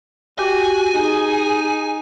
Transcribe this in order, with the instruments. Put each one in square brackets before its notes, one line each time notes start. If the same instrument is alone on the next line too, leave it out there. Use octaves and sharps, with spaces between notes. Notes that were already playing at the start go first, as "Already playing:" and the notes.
[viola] F#4 [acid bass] G4 [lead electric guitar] G#5
[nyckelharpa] D#4 [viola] G#4